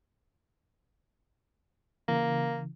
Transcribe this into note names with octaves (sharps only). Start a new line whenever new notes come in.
C#3 E3 A#3